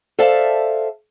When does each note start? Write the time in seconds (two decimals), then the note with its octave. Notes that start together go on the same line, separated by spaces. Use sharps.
0.19 A4 C5 D5 E5 F5 A5